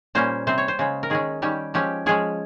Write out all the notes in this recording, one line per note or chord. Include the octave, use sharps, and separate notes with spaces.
A#2 G3 A#3 C#4 C5
C3 G3 C4 C5
C#5
C5
C#3 G#3 C#4
A#4
D#3 G#3 C#4 G#4
D#3 G3 C#4 G4
F3 G#3 C#4 G4
F3 G#3 C#4 G#4